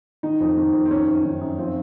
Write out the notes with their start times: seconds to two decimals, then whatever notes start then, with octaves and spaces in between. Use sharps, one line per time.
0.23 D#3 D#4
0.40 F2
0.57 D#3
0.73 F2
0.85 C4
0.91 D#3 C#4
1.08 F#2
1.25 D#3
1.41 F#2
1.58 F3 C4